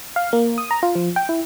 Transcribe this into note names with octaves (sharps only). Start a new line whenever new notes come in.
F5
A#3
D#6
A#5
F4
F3
G5
E4